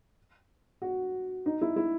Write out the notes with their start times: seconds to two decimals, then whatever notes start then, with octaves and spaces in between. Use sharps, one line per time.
0.82 F#4
1.46 D#4
1.62 E4
1.76 E4